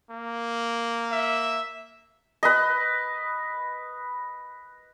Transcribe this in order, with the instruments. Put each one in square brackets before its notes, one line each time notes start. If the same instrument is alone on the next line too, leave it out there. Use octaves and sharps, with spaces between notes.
[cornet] A#3
[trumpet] E5
[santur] B4 D#5